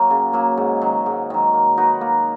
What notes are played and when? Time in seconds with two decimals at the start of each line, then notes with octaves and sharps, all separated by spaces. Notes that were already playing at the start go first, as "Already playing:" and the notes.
Already playing: F#3 A#3
0.10 C#3
0.33 F#3 A#3
0.57 G#2
0.82 D#3 F#3
1.06 G#2
1.30 D#3 F#3
1.54 A#3
1.77 D#4 F#4 B4
2.01 A#3